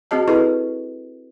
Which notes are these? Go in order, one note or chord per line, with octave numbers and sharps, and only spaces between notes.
C4 F#4 G#4 D#5 A5
E4 G#4 A4 B4 D#5